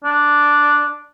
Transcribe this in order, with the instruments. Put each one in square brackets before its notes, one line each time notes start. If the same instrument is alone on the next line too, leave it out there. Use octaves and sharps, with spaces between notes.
[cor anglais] D4